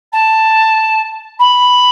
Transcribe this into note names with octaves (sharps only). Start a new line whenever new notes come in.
A5
B5